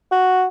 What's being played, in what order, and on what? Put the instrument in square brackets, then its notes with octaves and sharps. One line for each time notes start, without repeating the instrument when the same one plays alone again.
[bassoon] F#4